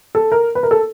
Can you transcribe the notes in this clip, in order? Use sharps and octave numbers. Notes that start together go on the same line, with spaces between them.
A4
A#4
B4
A#4
A4